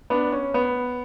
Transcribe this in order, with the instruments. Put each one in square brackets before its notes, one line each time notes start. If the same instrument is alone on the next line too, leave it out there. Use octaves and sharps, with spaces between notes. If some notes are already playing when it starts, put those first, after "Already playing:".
[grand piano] B3 D4
C#4
B3